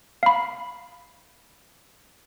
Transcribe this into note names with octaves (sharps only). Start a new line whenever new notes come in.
F5 B5